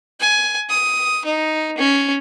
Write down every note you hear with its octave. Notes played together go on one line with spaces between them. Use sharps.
G#5
D#6
D#4
C#4